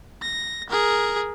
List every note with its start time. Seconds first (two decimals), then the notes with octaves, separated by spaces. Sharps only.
0.22 A#6
0.70 G#4 A#4